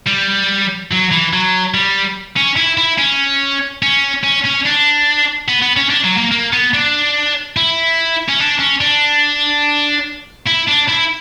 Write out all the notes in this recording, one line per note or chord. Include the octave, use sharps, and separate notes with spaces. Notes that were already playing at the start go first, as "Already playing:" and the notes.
G3
F#3
E3
F#3
G3
C#4
E4
E4
C#4
C#4
C#4
C#4
D4
B3
B3
C#4
D4
F#3
A#3
A#3
B3
D4
E4
C#4
D4
C#4
D4
E4
D4
E4